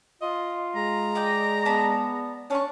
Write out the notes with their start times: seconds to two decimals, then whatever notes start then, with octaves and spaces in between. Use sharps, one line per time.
0.21 F4 D#5
0.76 G#3 A#5
1.15 D5 D#5 G5
1.65 B3 D5 A5 B5
2.50 C#4 D4 C#6